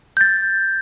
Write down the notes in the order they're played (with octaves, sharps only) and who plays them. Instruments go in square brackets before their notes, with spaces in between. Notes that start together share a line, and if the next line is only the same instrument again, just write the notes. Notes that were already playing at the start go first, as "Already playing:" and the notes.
[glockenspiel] G6 A6